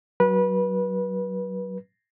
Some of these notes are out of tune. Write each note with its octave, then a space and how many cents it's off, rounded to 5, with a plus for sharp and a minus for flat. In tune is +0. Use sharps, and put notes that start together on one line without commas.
F#3 +20 B4 -25